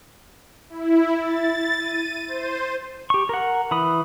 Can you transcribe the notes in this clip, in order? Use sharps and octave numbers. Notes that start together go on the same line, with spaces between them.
E4
A6
D#7
C5
G4 C#6
A#4 F#5
E3 B5 D#6